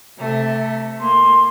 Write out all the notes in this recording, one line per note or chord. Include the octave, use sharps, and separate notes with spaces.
C3 A3
A#3 C6